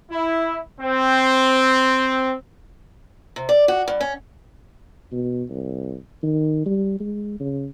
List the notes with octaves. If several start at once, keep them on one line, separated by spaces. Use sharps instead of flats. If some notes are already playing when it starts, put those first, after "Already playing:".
E4
C4
C3
D5
F#4
G2
C#4
B2
C2
D#3
G3
G#3
C#3